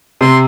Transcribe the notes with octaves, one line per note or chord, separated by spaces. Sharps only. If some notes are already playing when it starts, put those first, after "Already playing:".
C3 C6